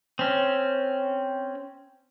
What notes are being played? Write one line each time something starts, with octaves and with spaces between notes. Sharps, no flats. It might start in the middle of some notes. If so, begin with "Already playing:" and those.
C4 C#4